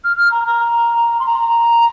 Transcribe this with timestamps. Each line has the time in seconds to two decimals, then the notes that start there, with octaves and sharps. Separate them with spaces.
0.04 F6
0.17 F6
0.31 A#5
0.44 A#5
1.19 C6
1.26 A#5